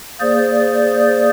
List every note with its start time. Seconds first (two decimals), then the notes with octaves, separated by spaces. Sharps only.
0.20 A#3 G#4 C5 D5